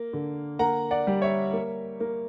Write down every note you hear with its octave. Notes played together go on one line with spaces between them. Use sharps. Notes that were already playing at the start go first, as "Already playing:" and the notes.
Already playing: A#3
D3
A#3 F#5 A#5
D5 F#5
G3
C#5 E5
A#3
A#3